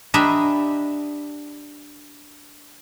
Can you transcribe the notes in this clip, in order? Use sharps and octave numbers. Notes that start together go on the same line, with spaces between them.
D4 G4 D#5 E5 A#5 B5